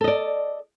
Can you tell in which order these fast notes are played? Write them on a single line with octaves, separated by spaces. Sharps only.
A4 D#5 D5